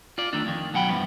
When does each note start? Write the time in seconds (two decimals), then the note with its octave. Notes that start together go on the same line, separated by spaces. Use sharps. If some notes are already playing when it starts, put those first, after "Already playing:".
0.18 F4 D5
0.33 D#3 A3 D4
0.46 F2 D#3
0.74 B2 F#3 F#5 G5 B5
0.89 E2 G2 F3 B3